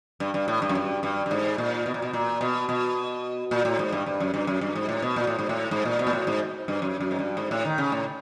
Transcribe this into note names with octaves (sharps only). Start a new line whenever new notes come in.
G2
G2
A2
G2
F#2
G2
G2
G2
G#2
A#2
B2
A#2
B2
A#2
B2
B2
A#2
A2
G#2
G2
G2
F#2
G2
F#2
G2
G#2
A2
B2
A#2
A2
G#2
A2
G#2
A#2
B2
A#2
A2
G#2
G2
F#2
F#2
G#2
G2
G#2
A2
D#3
C#3
A2